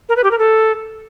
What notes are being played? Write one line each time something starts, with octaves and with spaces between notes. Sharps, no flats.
A#4
B4
G4
A#4
A4